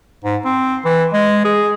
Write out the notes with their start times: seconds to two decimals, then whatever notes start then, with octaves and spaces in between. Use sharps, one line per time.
0.24 G#2
0.45 C4
0.85 E3
1.13 G#3
1.45 G#4